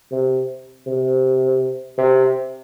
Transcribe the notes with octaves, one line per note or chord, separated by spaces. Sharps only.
C3
C3
C3